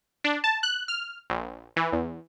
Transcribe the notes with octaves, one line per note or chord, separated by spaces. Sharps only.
D4
A5
F#6
F6
A#1
E3
E2